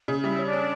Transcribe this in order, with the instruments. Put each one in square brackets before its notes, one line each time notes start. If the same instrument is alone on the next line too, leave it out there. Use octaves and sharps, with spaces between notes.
[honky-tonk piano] C#3
[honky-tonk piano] G3 [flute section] E4 E5
[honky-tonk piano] C#4
[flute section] D4 D5
[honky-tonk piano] C#4